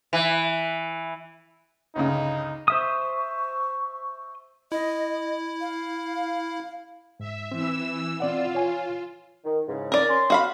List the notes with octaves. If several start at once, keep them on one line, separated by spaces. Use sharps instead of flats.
E3
G1 C#2 C#3 D#4
C5 E5 C#6 D#6
E4 D#5
F5
G#2 E5
E3 C4 E6
C4 F4 D5 F#5
C#5 G#5
D#3
G#2 C#3 E3
A#4 D5
C#4 C6
F#4 F5 B5